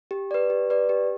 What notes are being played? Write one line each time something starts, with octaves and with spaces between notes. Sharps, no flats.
G4
B4 D5
G4
B4 D5
G4